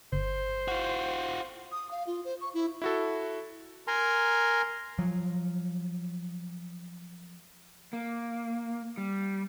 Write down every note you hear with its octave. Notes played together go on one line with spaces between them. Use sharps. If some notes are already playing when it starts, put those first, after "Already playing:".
G1 C5
F4 F#4
D#6
F5
F4
C5
C#6
E4
E4 F#4 A4
A#4 G#5 A#5 C6
F3 F#3
A#3
G3